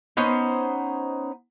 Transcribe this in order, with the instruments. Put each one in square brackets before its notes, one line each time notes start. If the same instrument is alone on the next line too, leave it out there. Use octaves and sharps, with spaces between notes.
[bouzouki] B3 C#4 D#4 C5